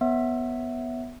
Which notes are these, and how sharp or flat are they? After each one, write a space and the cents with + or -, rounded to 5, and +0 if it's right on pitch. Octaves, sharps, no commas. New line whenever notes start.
B3 +0 C#5 -5 E5 +0